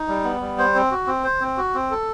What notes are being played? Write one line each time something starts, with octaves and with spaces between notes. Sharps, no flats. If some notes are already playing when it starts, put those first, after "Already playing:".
Already playing: D#4
G3
B3
G3
C5
C4
F#4
C4
C5
C4
F#4
C4
A4